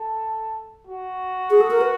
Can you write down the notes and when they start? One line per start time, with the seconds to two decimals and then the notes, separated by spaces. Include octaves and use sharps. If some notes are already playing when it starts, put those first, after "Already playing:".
Already playing: A4
0.87 F#4
1.50 G#4
1.61 A4
1.71 A#4
1.81 B4